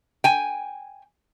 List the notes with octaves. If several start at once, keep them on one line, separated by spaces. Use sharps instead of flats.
G5 G#5